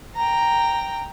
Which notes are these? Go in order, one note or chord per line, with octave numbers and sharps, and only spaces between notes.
G5 A#5